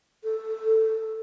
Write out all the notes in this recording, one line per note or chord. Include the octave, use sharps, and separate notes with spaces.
A4